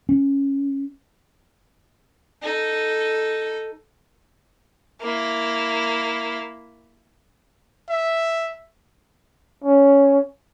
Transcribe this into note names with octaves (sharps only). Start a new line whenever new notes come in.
C#4
D#4 A4
A#3 E4
E5
C#4